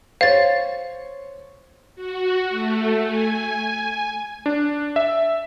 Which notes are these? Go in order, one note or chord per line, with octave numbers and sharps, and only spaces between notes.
C5 C#5 F5 A6
F#4
A3
G#5
D4
E5